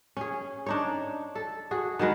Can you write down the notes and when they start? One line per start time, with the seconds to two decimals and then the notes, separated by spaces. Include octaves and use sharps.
0.17 C#4 G#4
0.66 D4 D#4 C#5
1.35 A4
1.71 F#4 G#4
1.99 D#3 F#3 G#3 B4